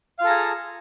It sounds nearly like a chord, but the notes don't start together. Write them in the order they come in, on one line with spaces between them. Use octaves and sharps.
F5 F4 A4 A#5 G#4